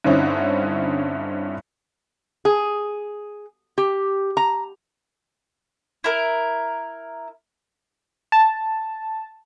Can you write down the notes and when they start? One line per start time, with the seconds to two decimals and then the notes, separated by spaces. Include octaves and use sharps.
0.04 G2 D3 C4 C#4 D#4 E4
2.45 G#4
3.78 G4
4.37 A#5
6.04 E4 A#4
8.32 A5